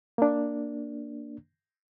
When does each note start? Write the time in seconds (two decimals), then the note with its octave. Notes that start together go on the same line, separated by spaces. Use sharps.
0.18 A#3 D4